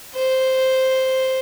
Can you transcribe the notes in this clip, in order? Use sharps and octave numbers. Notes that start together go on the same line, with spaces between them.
C5